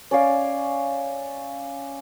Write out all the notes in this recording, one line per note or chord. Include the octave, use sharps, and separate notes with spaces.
C#4 D5 F5